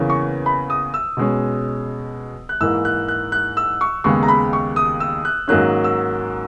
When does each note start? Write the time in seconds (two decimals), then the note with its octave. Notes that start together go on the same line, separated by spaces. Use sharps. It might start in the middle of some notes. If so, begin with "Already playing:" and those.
Already playing: E2 C#3 E3 A#3 C#4
0.10 C#6
0.46 B5
0.70 D#6
0.94 E6
1.17 B2 G#3 C#4
2.49 F#6
2.60 G#2 E3 A#3 E6
2.85 F#6
3.08 F#6
3.32 F#6
3.57 E6
3.81 C#6
4.04 D#2 C#3 G#3 B3 C#6
4.23 A#5
4.28 B5
4.53 C#6
4.76 D#6
5.00 E6
5.25 F#6
5.48 G#2 D#3 F#3 A#3 C#4 F#6
5.84 E6